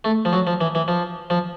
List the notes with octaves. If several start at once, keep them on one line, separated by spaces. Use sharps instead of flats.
A3
F3
F#3
F3
E3
E3
F3
F3